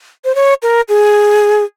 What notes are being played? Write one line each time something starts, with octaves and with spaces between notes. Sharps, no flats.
C5
C#5
A#4
G#4